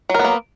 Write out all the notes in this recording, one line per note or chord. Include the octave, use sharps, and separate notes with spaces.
F#3 A#3 B3 A#4